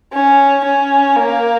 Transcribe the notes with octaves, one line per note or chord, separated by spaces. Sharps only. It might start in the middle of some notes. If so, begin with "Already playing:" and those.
C#4
C#4
A#3